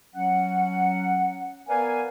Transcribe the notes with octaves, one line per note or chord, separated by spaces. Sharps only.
F#3 C#4 F#5
B3 A#4 B4 D5 F5 G#5